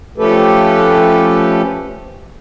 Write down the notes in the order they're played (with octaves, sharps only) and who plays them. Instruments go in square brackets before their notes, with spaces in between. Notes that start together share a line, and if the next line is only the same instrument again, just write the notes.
[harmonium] F3 A3 C#4 G4 A4 B4